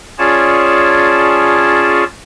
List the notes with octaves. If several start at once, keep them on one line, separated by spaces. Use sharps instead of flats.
C#4 F4 G#4 C#5 D5 A5